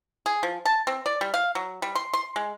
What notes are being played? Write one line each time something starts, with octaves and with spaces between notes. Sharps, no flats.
G#4
F3
A5
C4
D5
G3
F5
F#3
G3
C6
C6
G#3